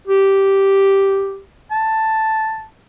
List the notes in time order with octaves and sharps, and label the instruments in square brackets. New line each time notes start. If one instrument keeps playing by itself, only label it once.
[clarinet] G4
A5